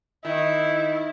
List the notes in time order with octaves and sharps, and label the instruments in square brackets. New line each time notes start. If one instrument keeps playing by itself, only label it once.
[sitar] D#3 [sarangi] E4